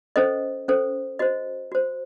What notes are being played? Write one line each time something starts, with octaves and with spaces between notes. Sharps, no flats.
C#4 A4 C5 D#5
C#4 A4 C5
F#4 C5 D#5
F#4 C5